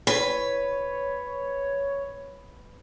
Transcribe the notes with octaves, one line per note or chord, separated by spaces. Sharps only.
B4 C#5